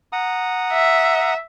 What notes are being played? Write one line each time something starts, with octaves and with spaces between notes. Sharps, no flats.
F#5 A#5 D#6
E5